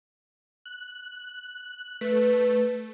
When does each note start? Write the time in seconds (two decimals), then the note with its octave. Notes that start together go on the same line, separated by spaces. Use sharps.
0.66 F#6
2.01 A3 B4